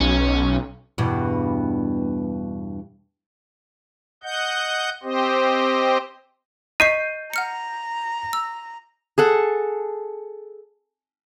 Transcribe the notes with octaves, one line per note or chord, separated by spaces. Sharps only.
B1 C#4
E2 G2 B2
D#5 F#5 G6
C4 G4 C5 D#5
D#5 C#6 G6 B6 C7 D#7
F#5 A#5 F6 C#7
E6
G#4 A4 F#5